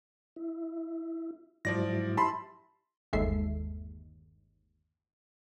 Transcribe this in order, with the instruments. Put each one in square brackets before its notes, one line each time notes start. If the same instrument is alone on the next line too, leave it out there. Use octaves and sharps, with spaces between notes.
[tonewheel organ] E4
[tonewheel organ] G#2 F#3 E4 [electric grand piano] F3 D5 A#6
[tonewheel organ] E4 G4 E5 [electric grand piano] A5 B5 C6
[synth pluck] G1 D#2 G#3 A4 E5 C7